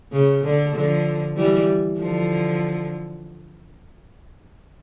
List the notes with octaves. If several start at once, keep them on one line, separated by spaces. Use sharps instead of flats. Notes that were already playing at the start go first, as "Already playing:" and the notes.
C#3
D3
D3 F3
E3 G3
D3 F3